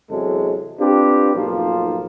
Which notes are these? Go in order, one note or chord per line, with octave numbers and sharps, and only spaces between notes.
E2 C3 F#3 G#3 A4
C4 D4 F4 G4 B4
B1 G#2 F3 A#3 F4